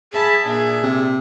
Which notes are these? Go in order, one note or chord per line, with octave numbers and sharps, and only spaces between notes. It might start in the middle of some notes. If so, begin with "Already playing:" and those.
G#4 E5 A5 B5
A#2 D4 E5
C3